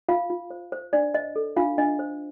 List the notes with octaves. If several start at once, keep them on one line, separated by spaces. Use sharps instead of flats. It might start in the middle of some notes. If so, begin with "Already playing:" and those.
F4 F5
F4
C5
C5
D4 D5
C5 D#5
A4
D4 F4 F5
D4 D#5
C5